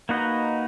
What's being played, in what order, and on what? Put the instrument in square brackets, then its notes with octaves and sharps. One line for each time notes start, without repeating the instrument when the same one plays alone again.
[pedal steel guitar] A#3 D#4 F#4 B4 D#5